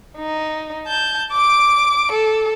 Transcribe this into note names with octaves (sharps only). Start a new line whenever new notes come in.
D#4
A5 G6
D6 D7
A4